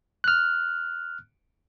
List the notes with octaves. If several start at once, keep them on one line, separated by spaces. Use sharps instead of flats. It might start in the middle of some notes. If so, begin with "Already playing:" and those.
F6 F#6